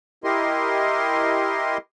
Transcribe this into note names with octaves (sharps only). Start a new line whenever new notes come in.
E4 G4 A#4 D#5 C6